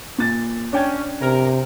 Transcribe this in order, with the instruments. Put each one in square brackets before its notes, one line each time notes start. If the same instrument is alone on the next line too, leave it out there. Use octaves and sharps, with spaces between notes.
[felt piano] A#2 A6
[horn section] C#4 [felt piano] D4 G5 G#6
[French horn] C3 [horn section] A#4